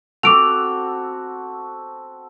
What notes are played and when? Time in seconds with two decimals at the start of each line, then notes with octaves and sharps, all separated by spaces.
0.23 C4 F#4 A4 D6 D7 F7